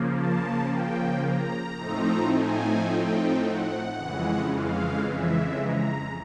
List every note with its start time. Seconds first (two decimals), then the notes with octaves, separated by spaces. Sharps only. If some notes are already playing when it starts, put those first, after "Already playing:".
Already playing: C#3 F3 A#3
0.13 A5
0.69 G5
1.24 A#5
1.78 A2 F3 A3 C4 D#4
2.32 G#5
2.87 G5
3.43 F#5
3.97 F2 C#3 E3 G#3
4.52 F5
5.07 E5
5.61 A#5